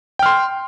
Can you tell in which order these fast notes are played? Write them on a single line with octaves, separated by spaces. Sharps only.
G5 F6 C6